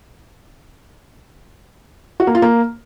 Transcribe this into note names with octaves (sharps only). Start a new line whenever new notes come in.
F#4
A#3
F4
A#3